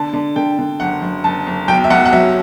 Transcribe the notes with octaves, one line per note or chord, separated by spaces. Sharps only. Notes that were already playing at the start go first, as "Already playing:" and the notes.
Already playing: D3 A5
D3
D3 G5
D3
F#1 F#5
F#1
F#1 A5
F#1
B1 G5
E5
B1 F#5
F#5
F#3 E5